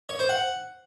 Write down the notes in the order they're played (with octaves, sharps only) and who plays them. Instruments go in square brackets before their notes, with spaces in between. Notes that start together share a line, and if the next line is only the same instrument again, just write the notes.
[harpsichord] C#5
C5
F#5